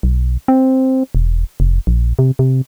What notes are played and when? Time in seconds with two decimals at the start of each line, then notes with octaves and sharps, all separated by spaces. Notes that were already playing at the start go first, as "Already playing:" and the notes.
0.03 B1
0.48 C4
1.15 E1
1.60 F1
1.87 A#1
2.19 C3
2.39 C3